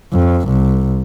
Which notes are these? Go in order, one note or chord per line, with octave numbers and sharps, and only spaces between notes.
F2
C2